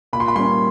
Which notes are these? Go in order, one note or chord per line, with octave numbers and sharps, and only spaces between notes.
A#2 B5
C6
B5
G3 A#3 C#4 C6